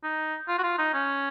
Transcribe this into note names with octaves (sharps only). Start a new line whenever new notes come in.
D#4
F4
F#4
F4
D#4
C#4